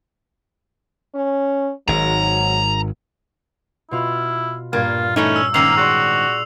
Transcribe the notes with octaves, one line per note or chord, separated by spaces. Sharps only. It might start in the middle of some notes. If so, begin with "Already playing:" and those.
C#4
G#1 G#2 F#3 A#5
B2 E4 F4 F6
G2 A#2 A#3 F4 G#6
E3 A3 C#4 D#4
E6
G#2 D#3 A#3 C#4 E6 C7 F7
F#4 G#4 D5 C6